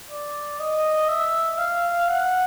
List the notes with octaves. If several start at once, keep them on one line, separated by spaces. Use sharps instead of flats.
D5
D#5
E5
F5
F#5